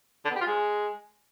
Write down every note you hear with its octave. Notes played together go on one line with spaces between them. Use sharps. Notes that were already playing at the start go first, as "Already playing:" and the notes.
D3
B3
G4
F4
G#3